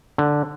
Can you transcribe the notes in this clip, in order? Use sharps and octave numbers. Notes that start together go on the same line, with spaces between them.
D3